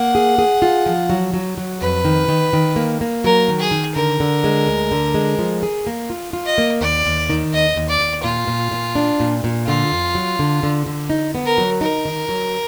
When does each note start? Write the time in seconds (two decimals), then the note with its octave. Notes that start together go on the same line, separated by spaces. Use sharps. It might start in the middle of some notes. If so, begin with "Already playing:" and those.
Already playing: A#3 F#5
0.15 G#4
0.38 G#4
0.62 F4
0.86 F3
1.10 F#3
1.34 F#3
1.58 F#3
1.81 F2 B4
2.05 D#3
2.28 D#3
2.53 D#3
2.76 A#3
3.01 A#3
3.24 F#3 A#4
3.48 D#3
3.59 G#4
3.71 D#3
3.95 D3 A#4
4.20 D3
4.44 G#3
4.67 D2
4.91 D3
5.14 G#3
5.39 F3
5.63 G#4
5.87 A#3
6.10 F4
6.33 F4
6.46 D#5
6.58 A#3
6.81 D#2 D5
7.06 D#2
7.30 D#3
7.53 D#2 D#5
7.76 D#2
7.89 D5
8.00 D#2
8.24 A#2 F4
8.48 A#2
8.71 A#2
8.96 D4
9.20 A#2
9.44 A#2
9.67 D3 F4
9.92 F2
10.15 F#3
10.39 D3
10.63 D3
10.86 D3
11.10 D#4
11.35 B3
11.46 A#4
11.58 F#3
11.81 D#4 A#4
12.05 D#3
12.29 F#3